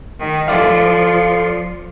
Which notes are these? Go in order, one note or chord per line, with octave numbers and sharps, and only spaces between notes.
D#3
F3 F4 A4 D5 F5